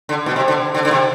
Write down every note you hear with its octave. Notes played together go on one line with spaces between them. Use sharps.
D3
B2
C3
D3
D3
D3
C3